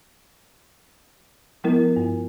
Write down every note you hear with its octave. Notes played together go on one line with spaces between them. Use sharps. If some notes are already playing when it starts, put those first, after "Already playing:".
F3 G#3 B3 E4 A#4
G2